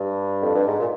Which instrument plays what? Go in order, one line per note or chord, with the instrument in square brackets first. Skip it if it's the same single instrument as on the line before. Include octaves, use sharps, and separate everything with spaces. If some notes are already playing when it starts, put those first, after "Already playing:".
Already playing: [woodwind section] G2
F2
G2
G#2
A#2